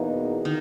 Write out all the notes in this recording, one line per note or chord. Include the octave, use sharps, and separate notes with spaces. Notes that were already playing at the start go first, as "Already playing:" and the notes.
Already playing: E2 B2 E3 A#3 D#4
D#3